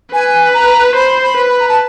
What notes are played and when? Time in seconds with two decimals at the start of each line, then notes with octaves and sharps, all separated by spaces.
0.13 B4 G#5
0.54 A#5
0.95 C5 B5
1.23 B5
1.37 B4
1.50 B5
1.60 A#5
1.69 A5